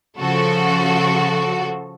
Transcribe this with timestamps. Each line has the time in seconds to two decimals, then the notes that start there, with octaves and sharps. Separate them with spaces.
0.18 C#3 F3 F#4 A4